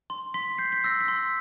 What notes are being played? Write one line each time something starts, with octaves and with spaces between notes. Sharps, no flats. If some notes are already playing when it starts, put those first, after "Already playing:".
C6
C6 B6
G6 C7
B6
E6 A#6
B6
C6